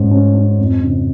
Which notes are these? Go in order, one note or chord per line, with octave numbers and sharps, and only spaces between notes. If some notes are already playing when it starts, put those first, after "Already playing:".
Already playing: G#2 C#4
C#4
C#4
F2
C#3